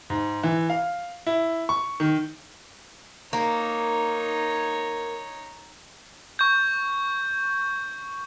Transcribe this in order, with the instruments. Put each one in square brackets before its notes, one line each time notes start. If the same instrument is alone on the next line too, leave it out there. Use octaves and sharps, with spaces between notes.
[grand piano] G#2
E3
F5
E4
C#6
D#3
[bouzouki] A#3 [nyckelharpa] D#4 C#5
[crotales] C#6 G6